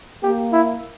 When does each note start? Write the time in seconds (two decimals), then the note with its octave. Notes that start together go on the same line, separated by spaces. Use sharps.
0.23 A#3 G4
0.53 E4